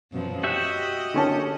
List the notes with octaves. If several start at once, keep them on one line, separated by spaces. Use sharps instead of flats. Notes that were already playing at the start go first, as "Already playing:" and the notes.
F#2 B2 F3
F#4 G4 D#5 E5
D3 C#4 A5